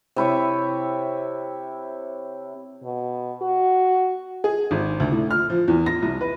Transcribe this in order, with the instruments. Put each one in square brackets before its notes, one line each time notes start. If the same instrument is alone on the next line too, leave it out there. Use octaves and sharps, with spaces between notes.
[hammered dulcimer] C3 E4 C#5 E5
[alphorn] B2
F#4
[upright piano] G#4
G#1
D2
A2
F6
F3
E2
A#6
C2
B4